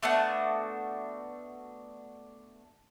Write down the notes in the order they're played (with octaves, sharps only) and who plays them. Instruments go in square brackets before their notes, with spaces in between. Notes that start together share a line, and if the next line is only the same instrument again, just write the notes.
[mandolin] A3 B3 D4 F#4